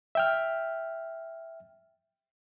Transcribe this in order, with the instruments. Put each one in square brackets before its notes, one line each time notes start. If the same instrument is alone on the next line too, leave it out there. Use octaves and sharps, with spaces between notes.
[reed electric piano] E5 G5 F6